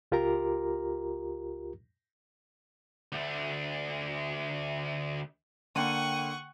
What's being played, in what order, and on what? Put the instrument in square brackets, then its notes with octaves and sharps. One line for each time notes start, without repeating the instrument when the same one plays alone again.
[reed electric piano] C#2 F4 G4 A#4 A#5
[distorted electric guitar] D2 A3
[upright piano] D3 A#3 [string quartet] F#5 C#6 [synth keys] G5 D#7